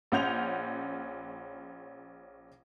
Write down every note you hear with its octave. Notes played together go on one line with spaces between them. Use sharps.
A#1 C#4 F#5 G6 F7